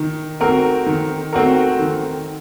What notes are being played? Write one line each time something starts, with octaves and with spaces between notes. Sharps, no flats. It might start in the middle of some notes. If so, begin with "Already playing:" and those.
Already playing: D#3
A3 C4 F#4 A#4
D#3
A3 C4 F#4 A#4
D#3